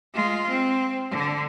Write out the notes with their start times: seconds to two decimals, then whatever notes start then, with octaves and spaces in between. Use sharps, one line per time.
0.14 G#3 F4
0.49 C4
1.11 D3